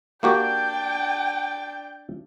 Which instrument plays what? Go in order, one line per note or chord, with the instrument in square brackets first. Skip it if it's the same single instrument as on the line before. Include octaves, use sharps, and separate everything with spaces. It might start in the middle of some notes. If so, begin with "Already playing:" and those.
[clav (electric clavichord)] A#3 F#4 G4 [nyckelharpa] D4 D5 [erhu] G5